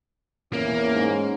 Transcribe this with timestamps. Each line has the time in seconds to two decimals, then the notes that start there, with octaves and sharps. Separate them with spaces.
0.53 E2 A#3 C#4
0.93 G#2